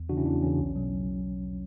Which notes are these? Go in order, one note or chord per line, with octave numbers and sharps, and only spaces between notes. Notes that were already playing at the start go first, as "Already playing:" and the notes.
Already playing: E2
C#3 E3 D4 F#4
C#4 E4
E2 D4
C#3 E3 C#4
B1
B2 F#3